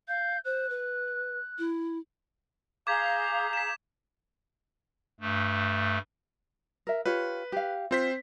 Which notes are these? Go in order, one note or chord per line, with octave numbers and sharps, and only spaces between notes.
F5 G6
C5 F#6
B4
E4
G#4 F5 A#5 D6 G6 G#6 B6
B6 E7
G2 A3
A#4 E5
F4 G4 B4 C#5
G4 F5
C4 F4 C5 B6